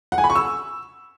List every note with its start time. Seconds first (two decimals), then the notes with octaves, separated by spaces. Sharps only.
0.12 F#5
0.18 G#5
0.24 B5
0.30 C#6
0.35 E6